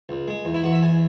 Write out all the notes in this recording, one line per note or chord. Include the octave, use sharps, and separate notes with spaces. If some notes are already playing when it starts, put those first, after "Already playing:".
C#2
G#3
E2
E4
E2 F#4
E5
E2 G#5